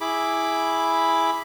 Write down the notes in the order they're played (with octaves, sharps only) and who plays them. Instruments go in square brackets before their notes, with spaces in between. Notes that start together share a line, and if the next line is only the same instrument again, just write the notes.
[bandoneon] E4 G#4 B5 D6